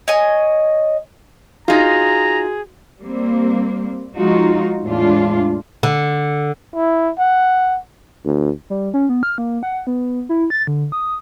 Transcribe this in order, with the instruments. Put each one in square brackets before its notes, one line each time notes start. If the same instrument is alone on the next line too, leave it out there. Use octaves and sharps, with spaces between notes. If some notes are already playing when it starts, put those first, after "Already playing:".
[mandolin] C#5 D#5 G#5
[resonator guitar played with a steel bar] D#4 F4 [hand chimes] F#4 [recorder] G#4 [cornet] A#5
[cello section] G3 A#3 C4
F3 G#3 D#4 F4 F#4
E2 A2 G#3 D4 F4
[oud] D3
[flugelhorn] E4
F#5
[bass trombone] D2
[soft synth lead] G3
C#4
B3
F6
A#3
F#5
B3
E4
A6
D3
D#6